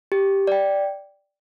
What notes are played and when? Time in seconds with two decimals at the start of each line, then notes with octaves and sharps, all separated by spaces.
0.12 G4
0.47 D5 G5